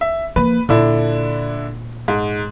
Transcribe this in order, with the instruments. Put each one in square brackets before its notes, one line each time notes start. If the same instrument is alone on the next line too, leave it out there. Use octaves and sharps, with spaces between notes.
[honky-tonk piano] E5
[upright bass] F3 A#3 [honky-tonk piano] B4
[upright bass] A#2 [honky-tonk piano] D3 D4 E4
[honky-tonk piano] G#2